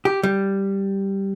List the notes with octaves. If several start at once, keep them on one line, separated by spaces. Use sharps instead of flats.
G4
G3